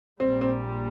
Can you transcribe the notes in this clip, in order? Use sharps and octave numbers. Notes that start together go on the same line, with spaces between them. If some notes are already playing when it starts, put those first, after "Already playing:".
A#1 A#2 G3 C4
C4